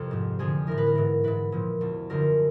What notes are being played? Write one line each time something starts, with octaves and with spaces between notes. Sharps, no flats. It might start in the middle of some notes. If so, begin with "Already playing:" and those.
Already playing: F2 C3 A4
G#2 F3
F2 D3 F3 G#4
A2 E3 A#4
B4
A#4
G#2 E3
G#2 E3 B4
A#2 F3
E2 B2
F#2 D3 F3 A#4